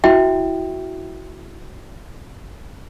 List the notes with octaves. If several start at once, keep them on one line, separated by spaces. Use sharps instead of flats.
E4 F#4 E5 G5